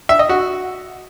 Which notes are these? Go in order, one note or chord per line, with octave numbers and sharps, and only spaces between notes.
E5
D#5
F#4